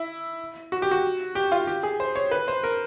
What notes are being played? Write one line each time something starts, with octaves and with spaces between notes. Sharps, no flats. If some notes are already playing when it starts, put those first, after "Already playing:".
Already playing: E4
F#4
G4
F#4
G4
F4
G4
G#4
C5
C#5
B4
C5
A#4